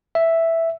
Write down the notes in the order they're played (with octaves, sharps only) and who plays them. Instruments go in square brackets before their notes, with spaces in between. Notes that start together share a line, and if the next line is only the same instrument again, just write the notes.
[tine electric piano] E5